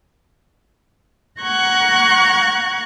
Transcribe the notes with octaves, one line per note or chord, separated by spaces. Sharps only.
F#5 A#5 C#6 F#6 G#6